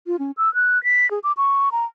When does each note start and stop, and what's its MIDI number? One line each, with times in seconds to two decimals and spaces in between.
0.07 0.19 65
0.19 0.31 61
0.37 0.53 88
0.54 0.82 90
0.84 1.09 95
1.11 1.19 68
1.24 1.32 86
1.37 1.69 85
1.72 1.85 82